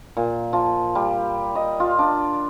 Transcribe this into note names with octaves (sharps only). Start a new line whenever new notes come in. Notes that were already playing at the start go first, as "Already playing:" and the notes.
A#2
F3
G3
D#5
F4
D4